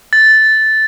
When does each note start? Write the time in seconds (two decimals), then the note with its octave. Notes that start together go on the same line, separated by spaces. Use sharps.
0.13 A6